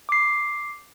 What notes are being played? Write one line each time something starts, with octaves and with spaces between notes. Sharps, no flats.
D6 C7